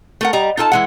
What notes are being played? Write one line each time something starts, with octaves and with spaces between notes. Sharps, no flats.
A3 A#4 F#5
G3 D#5 A#5
D#4 F4 A4 A5
E3 G#3 F#5